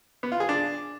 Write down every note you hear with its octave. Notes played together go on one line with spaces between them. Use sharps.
B3
F4
G#4
D4